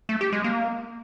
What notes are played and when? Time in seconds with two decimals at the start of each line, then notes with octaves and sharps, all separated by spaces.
0.09 A3
0.21 G4
0.33 G#3
0.44 A#3